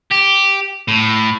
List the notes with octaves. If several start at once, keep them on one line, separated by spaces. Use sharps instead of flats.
G4
A2